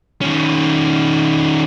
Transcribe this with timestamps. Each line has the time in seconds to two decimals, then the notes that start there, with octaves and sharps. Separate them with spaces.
0.21 D#3 C#4